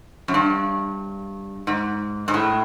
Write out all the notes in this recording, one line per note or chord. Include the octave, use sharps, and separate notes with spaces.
F#2
G2
G#2
G#2
A2